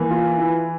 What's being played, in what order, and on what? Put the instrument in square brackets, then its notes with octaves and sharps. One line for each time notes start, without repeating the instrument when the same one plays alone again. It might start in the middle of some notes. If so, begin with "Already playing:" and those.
Already playing: [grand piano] E3 [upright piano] A#3
[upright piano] F4
E3